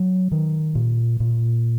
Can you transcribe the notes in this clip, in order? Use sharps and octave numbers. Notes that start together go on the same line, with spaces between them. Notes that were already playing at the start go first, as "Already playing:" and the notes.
Already playing: F#3
D#3
A#2
A#2